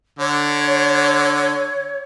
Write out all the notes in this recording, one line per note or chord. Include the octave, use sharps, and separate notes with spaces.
D3 C#5